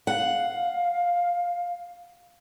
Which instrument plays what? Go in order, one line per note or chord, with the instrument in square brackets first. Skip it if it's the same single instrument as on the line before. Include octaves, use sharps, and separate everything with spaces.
[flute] F5 [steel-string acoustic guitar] F#5